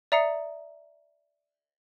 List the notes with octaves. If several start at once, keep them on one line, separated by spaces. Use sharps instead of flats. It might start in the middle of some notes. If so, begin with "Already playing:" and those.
D5 E5 A#5 D#6 C7 C#7